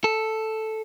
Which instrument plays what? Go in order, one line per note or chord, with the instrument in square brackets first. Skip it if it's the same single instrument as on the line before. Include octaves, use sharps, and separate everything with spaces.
[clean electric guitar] A4